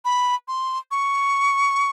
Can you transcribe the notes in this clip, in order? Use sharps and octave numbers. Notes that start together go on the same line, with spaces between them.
B5
C6
C#6